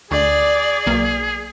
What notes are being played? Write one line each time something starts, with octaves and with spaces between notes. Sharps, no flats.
D2 G#4 D5
B1 A#3